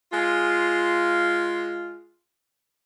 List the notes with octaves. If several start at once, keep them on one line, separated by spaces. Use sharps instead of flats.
G#3 F4